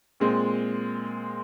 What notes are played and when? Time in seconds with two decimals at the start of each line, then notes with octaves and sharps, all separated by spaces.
0.20 A#2 G#3 C4